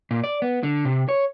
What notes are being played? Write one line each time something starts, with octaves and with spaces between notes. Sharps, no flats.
A#2
D5
B3
D3
C3
C#5